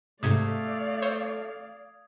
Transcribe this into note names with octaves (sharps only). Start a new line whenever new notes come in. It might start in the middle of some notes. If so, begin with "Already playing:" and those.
G#2 C3 A3 D5 F5 D#6 G#6
C5 C#5